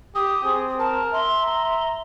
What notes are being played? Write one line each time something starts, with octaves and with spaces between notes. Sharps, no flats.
G4 D#6
C4 G#4
A#4 A5
E5 C6
A#5